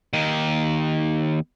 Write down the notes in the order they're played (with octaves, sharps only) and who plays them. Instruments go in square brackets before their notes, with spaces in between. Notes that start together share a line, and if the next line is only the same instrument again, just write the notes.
[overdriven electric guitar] D#2 D#3